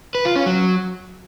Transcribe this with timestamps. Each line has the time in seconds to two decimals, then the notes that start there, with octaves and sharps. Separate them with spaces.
0.15 B4
0.25 F4
0.36 C#4
0.46 F#3